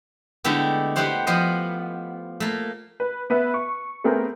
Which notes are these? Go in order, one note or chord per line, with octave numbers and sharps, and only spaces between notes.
D3 G#3 A3 B3 E4 G4
B3 E4 G4 C5 F#5
F3 B3 C5 D#5
A3 A#3
B4
B3 B4 E5
C#6
A3 B3 C4 G#4 A#4